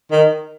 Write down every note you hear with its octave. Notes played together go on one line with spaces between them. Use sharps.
D#3